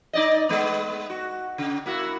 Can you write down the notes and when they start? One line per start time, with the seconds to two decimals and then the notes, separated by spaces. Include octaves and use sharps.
0.13 D#4 D5 D#5
0.49 G#3 B3
1.10 F#4
1.58 C#3
1.86 A#3 E4 F#4